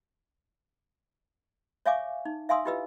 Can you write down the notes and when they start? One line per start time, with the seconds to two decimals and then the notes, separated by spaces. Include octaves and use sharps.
1.86 C#5 E5 F5 G#5 C#6 D6
2.25 D#4
2.49 E5 F5 G#5 C6 D#6 E6
2.65 E4 F4 G4 B4 D#5 E6